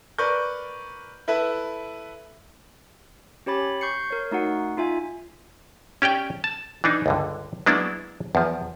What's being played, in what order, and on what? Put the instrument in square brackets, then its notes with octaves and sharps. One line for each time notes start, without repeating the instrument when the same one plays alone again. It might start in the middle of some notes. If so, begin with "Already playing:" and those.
[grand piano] A#4 B4 D5 C#6 G6
E4 A4 B4 E5
[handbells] C#4 G4 C#5 B5 A6
C#6 G6 C7 C#7
A#4 C#5
A3 D#4 F#4 F#5
D#4 F4 E5 G#5
[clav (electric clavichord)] C#4 G4 D5 G5
A5
E3 D4 D#4
C#2 G2 D3
F#3 G#3 A#3 B3 D4 E4
E2 F3